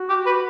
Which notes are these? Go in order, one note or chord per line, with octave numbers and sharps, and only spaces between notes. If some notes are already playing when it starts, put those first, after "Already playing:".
Already playing: F#4
G4
B4